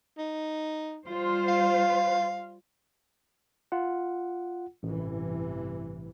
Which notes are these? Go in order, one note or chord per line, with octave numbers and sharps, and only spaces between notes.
D#4
G3 F4 C5
F5
F4 F#5
A1 G2 C3 E3